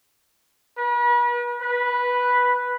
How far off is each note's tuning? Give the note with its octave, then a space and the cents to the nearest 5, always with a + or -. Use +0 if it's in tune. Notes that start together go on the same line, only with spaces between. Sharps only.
B4 -40
B4 -5